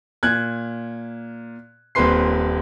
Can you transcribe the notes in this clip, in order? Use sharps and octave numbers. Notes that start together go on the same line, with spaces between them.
A#2 F#6 G#6
D#1 A#2 C4 B4 C6 C7